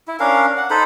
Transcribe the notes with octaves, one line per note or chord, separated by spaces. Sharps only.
E4
C#4 D4 A#4 F5
F#5
D#4 A4 C5 B5